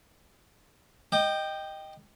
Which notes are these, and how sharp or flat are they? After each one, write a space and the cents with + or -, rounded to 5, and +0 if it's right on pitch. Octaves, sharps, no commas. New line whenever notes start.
D#5 +0 G5 +0 D#6 -45